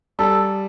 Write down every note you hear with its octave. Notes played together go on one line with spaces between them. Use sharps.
G3 A4